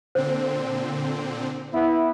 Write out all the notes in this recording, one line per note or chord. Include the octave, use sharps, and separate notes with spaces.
A#2 D3 C4 C5
B3 E4